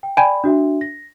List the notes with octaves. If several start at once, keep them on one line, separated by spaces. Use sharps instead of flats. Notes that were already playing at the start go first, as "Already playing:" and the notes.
G5
D5 G5 G#5 B5
D4 F#4 E5
A#6